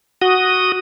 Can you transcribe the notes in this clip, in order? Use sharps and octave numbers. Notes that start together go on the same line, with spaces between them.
F#4 D#6